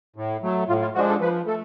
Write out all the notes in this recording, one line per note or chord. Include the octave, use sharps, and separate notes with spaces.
A2
F#3 A3
A2 F4
F4
F3 G#3 D4 F#4
A4
F3 B4
A3 A4